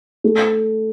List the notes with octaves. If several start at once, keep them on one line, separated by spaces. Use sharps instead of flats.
A3